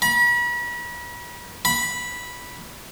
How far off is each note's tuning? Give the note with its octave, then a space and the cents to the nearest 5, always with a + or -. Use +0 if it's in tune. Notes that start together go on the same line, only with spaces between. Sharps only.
B5 -40
B5 -10